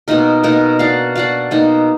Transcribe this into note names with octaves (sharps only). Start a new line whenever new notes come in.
B2 A#3 D#4 A#4
B2 A#3 D#4 A#4
D4 F#4 D5 F5
D4 F#4 D5 F5
B2 A#3 D#4